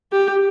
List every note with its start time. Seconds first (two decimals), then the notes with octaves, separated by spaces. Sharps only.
0.12 G4